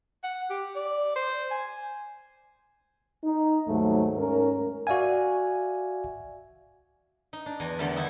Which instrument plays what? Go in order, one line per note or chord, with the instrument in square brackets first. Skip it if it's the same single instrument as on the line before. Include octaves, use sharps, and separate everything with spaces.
[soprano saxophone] F#5
G4
D5
C5
G#5
[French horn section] D#4
D#2 G#2 F#3 A3
G#2 C#4 A#4
[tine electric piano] F#4 D5 E5 F5 G#5
[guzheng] D#4
D4
E2 G#5 A#5
E2 D3 G3 A3 A#4 B5
D#4 E4